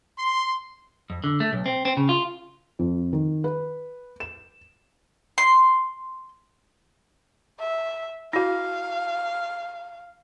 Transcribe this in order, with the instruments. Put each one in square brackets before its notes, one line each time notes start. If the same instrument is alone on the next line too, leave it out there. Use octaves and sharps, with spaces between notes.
[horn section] C6
[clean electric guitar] F2
D3
A3
B1
C4
C4
C#3
F4
[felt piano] F2
D#3
B4
E7
[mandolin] C6
[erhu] E5
[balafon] E4 F#4 [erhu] F5